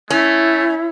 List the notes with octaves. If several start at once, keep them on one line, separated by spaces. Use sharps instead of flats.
A3 C#4 E4